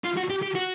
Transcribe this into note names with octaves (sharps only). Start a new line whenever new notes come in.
F4
F#4
G4
G4
F#4